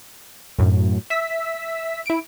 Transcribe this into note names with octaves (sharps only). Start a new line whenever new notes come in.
F#2 A2
E5 E6 B6
E4 D7